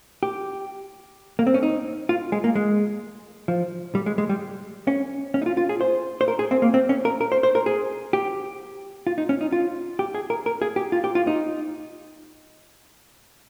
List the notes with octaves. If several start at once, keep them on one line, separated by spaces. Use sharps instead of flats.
G4
A#3
C4
C#4
D#4
F4
G#3
A#3
G#3
F3
G3
G#3
G#3
G3
C#4
C#4
D#4
F4
F4
G#4
C5
C5
A#4
G#4
C4
A#3
C4
C#4
A#4
A#4
C5
C5
A#4
G#4
G4
F4
D#4
C#4
D#4
F4
G4
G#4
A#4
A#4
G#4
G4
F4
G4
F4
D#4